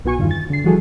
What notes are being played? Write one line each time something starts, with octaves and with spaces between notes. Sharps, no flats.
B1 B3 F#4 G#5 C#6
E2 G2 D#3 F4
A6
D3 C7
E3 F3 G3 F#4 G#4 A4